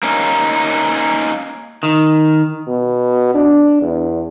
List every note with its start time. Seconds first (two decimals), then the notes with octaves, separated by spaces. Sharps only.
0.03 A#3 C#4 D#4
1.83 D#3
2.68 B2
3.34 D4
3.81 E2